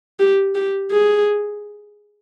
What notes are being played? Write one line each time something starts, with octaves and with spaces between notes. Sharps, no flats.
G4
G4
G#4